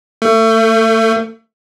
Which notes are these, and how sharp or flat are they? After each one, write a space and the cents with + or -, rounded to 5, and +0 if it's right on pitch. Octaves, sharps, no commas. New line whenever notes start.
A3 +30